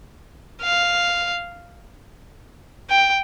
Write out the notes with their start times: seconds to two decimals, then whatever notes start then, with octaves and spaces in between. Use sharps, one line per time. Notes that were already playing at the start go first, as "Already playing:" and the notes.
0.62 F5
2.90 G5